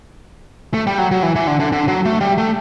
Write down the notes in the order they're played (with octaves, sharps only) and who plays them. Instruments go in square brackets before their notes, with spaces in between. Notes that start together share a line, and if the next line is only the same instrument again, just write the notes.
[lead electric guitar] A3
G3
F#3
F#3
E3
E3
D3
D3
D3
F#3
A3
G3
A3